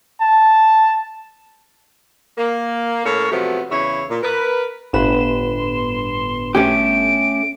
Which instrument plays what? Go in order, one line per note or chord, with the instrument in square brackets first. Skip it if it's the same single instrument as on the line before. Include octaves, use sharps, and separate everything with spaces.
[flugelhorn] A5
[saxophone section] A#3
A2 C#4 A4 A#4 C#5
C3 F3 F#3 A3 B3
E2 C#3 C#4 E4 C#5
A#2
A#4 B4
[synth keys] G1 E7 [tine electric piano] A2 B4 B5 [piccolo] C6
[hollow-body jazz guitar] A3 C#4 G4 [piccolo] D7